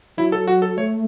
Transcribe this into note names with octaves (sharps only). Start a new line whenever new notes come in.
F#3 E4
A4
F#4
A4
A3 C#5